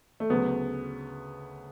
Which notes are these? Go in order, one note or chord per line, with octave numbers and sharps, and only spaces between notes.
A3
D2 C#3 F#3 B3